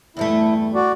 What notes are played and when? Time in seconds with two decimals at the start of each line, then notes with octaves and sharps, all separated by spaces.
0.17 E2 G2 A3 E4
0.75 F#4 D5